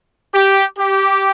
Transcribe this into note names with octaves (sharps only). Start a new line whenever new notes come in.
G4
G4